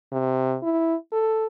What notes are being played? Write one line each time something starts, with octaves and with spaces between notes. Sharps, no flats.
C3
E4
A4